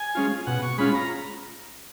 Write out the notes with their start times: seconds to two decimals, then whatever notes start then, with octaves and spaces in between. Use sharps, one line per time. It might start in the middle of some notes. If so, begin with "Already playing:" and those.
Already playing: G#5
0.15 G#3 C#4 F4
0.47 B2 F#5
0.62 C#6
0.78 G#3 C#4 F4 B5
0.95 A#5